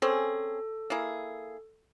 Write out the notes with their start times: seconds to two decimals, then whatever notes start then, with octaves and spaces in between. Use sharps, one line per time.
0.02 C4 C#4 G#4 A4
0.90 A#3 E4 G#4